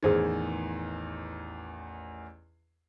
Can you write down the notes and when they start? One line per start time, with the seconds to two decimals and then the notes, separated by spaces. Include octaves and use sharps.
0.03 A1 E2 D#3 G#4 C5 G#6